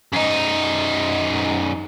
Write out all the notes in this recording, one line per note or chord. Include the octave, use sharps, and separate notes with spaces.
F#2 D#4